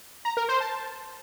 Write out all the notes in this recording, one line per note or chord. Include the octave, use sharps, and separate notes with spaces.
A#5
A#4
C5
A5